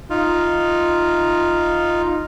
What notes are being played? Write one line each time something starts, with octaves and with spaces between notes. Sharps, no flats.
D#4 F4